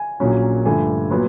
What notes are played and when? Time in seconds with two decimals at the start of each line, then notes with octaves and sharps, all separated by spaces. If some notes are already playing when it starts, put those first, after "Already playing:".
Already playing: G#5
0.20 A#1 A#2 F#3 A#3 C#4
0.65 G2 D3 F3 A3 G#5
1.10 A#2 F#3 B3